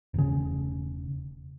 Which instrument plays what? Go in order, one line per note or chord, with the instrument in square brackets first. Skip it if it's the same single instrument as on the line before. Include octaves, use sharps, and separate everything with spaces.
[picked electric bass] E1 C#3